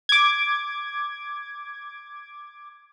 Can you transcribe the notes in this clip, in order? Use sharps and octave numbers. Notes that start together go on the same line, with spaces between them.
D6 G#6